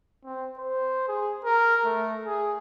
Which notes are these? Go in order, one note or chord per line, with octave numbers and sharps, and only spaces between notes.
C4
C5
G#4
A#4
A3
G#4